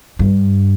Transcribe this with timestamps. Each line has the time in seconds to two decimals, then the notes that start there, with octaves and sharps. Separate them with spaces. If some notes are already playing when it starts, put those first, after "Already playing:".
0.19 G2